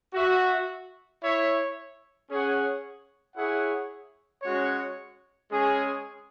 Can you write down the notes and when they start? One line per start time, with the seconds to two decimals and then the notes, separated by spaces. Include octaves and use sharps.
0.13 F#4 E5
1.20 E4 C#5 E5
2.27 C#4 G#4 C#5 F#5
3.35 E4 G#4 C#5 F#5
4.42 G#3 C#4 F#4 C#5
5.49 G#3 C#4 G#4